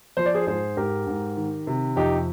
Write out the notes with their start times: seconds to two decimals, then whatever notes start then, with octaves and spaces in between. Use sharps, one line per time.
0.17 F3 C5
0.26 D5
0.34 G#4 C5
0.47 G#2 G#4 C5
0.77 G#2 G4 A#4
1.07 G#2
1.37 D#3
1.67 C3
1.96 F2 D#4 G4